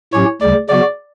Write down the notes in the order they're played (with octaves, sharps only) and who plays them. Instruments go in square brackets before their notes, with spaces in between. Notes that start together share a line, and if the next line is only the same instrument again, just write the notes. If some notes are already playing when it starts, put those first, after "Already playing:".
[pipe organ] A2 F#3 C#4 G4 [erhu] C#5
[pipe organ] D2 C#3 G3 [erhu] D5
[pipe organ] C#3 F#3 B3 F#4 [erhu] D5